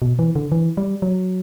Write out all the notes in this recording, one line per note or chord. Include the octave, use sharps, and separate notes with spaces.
B2
E3
D3
E3
G3
F#3